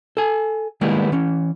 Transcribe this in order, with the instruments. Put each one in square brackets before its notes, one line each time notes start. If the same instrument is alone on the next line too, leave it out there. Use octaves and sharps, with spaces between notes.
[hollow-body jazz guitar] A4 G#5
D#3 G3 G#3 A#3 B3 E4
E3 C#4